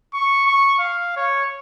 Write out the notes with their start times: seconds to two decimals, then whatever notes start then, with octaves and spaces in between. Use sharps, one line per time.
0.14 C#6
0.46 C#6
0.79 F5
1.17 C#5